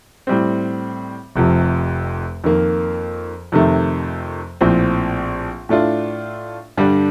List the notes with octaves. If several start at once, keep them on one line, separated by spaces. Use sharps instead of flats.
A2 G3 C4
F1 F2 C3 F3
F2 D#3 A#3
F2 C3 D#3 A3
A#1 A2 F3 C4
A2 A3 D4 F4
G2 D3 G3 D4